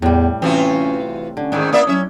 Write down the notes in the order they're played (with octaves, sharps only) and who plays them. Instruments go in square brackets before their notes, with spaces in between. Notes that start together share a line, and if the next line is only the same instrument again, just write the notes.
[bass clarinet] E2 [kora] A2 G3
[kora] C3 C4 [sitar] E3 F4 F#4 [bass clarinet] C#4
[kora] D3 [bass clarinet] C#4
[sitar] G#2 D#3 [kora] D4 E4
[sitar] A#3 D5 E5
[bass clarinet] F#3 [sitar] C#4 E5